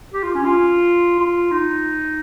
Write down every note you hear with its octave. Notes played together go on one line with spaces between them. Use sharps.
G4
F4
C#4
F4
F4
D#4